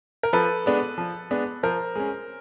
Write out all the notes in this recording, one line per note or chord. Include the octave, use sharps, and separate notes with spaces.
A#4
F3 A4 B4
G#3 B3 D4
F3
G#3 B3 D4
F3 A#4 C5
G#3 C#4